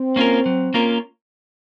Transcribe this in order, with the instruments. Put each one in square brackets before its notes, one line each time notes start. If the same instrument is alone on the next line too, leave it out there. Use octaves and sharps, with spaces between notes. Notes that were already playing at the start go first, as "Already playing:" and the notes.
Already playing: [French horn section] C4
[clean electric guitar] A#3 C#4 F4 A#4
F#3
A#3 C#4 F4 A#4